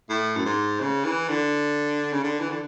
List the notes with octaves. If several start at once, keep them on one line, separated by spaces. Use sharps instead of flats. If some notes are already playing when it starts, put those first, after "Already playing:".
A2
F#2
G#2
C#3
E3
D3
C#3
D3
E3
D3